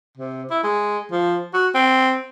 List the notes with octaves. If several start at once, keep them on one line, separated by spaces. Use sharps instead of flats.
C3
E4
G#3
F3
F#4
C4